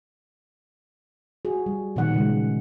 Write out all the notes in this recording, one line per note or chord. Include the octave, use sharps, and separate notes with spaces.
F#4 G#4
G3
A#2 D#3 F3 B3 F#5
C#3 G#3